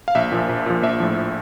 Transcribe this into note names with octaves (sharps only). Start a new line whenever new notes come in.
F5
A#1 E5
A#2 F3
A#1
A#2 F3
A#1 E5
A2 F3